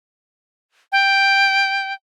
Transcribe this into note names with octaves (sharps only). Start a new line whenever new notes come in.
G5